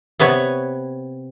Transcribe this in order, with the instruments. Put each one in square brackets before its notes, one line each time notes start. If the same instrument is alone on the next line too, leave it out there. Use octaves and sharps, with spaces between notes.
[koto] C3 B3 B4 C#5